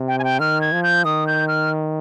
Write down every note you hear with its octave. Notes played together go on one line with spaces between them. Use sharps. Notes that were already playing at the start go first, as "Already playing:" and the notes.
Already playing: C3
G5
G#5
G5
D#3 F6
G#6
F3
G6
D#3 D#6
G6
F6